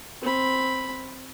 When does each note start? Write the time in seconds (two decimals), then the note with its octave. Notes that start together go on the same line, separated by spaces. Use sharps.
0.22 C4 B5